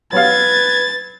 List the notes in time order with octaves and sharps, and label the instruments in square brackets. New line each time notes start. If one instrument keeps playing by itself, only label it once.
[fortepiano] F#3 B3 F5 [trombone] B4 [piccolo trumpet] G#6 [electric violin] A6